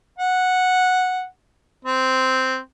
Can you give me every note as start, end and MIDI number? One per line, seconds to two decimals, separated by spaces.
0.19 1.24 78
1.85 2.57 60